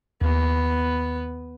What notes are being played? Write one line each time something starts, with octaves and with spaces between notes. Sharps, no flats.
D#2 B3 B4